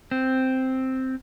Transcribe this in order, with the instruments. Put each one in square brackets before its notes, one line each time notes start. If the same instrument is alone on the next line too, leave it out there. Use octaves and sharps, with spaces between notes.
[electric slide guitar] C4